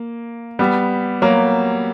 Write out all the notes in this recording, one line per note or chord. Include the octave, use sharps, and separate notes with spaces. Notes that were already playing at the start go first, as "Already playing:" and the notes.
Already playing: A#3
G3 B3
F#3 A#3